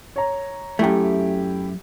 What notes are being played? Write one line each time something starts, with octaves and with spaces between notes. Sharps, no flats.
C#5 A#5
F#2 A3 E4 G4